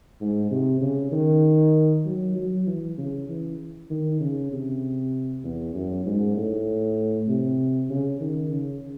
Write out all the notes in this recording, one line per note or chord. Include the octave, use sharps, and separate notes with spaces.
G#2
C3
C#3
D#3
F#3
F#3
E3
C#3
E3
D#3
C#3
C3
E2
F#2
G#2
A2
C3
C#3
D#3
C#3